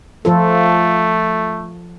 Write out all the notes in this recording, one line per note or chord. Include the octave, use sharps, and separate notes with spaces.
F3 A3 F4 A4